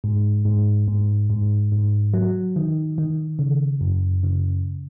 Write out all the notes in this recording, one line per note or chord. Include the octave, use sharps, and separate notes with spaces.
G#2
G#2
G#2
G#2
G#2
F#3
D#3
D#3
C#3
F#2
C#3